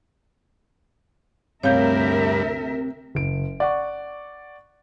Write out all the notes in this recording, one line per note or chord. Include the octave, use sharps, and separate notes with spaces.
D2 G2 C3 A#4 C#5 E5 F5 G6
F#1 D7
D5 F#5 C#6